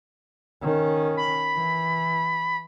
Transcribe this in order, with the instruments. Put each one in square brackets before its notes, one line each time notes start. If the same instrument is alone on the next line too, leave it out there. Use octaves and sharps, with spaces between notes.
[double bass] D#3 C#4
[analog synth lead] B5
[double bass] E3